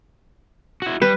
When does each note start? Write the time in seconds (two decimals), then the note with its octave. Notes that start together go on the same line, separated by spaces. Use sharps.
0.82 E4 F#4
1.02 G3 B4